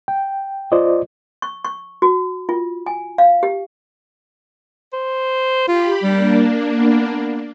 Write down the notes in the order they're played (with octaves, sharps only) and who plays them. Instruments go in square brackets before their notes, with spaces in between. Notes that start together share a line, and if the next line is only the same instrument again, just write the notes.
[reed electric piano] G5
F4 C5 D5 D#5
[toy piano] C#6
C#6
F#4
F4
G#5
F5
G4
[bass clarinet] C5
[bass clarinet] F4 [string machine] G4 B5
[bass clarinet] G3 [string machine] A#3 D4
[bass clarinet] B3